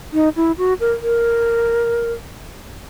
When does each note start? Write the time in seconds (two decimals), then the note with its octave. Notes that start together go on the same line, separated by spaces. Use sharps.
0.13 D#4
0.36 E4
0.58 F#4
0.80 A#4
1.02 A#4